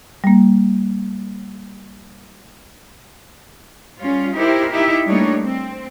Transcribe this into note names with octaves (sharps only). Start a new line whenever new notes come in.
G3 A#3
G3 C#4 F4
D#4 E4 G4 A#4 C5
D#4 E4 G4 E5
G3 A3 A#3 D4 D#4 C#5
C4